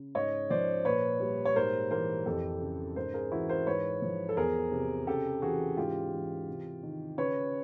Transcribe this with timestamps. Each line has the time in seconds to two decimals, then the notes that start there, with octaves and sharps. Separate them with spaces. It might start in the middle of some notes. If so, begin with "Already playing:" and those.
Already playing: C#3
0.15 G#2 C#5 D#5
0.50 F3 C5 D5
0.85 A#2 B4 C#5
1.20 G3
1.45 C#5
1.56 G#2 A#4 C5
1.91 E3 A#4 C5
2.26 F2 G4 A4
2.61 C#3
2.96 G#2 A#4 C5
3.14 G#4 A#4
3.32 E3 E4 F#4
3.49 A#4 C5
3.67 G#2 B4 C#5
4.02 F3
4.29 A4
4.37 E2 G#4 A#4
4.72 C3
5.07 C#3 G4 A4
5.42 E3 F#4 G#4
5.77 G#2 F4 G4
6.13 E3
6.48 C3
6.83 D#3
7.18 C#3 B4 C#5